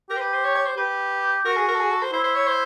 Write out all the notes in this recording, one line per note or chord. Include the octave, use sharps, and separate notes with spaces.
G4 A#4
C5
B4
C5
C#5
C#5
C5
G4 B4
F#4 A#4
G#4
A#4
A4
G#4
A4
C5
E4 C5
C5
C#5
C5